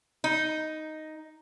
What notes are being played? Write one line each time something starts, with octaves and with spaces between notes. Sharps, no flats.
D#4